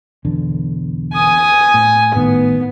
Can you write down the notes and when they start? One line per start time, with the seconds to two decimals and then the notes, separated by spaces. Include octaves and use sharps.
0.25 B1 E2 D3
1.14 G#5 D#6
1.74 A2
2.15 G#1 A2 D#3 B3